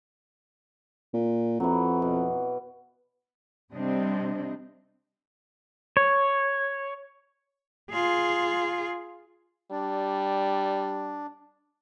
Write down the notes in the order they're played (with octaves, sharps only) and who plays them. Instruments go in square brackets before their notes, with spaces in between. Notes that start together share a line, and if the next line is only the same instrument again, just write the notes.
[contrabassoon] A#2
[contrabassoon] F2 [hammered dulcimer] E3 F#3
[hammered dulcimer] B2
[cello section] C3 G3 C4 D4 D#5
[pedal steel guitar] C#5
[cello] F4 G#4
[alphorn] G3 [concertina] D4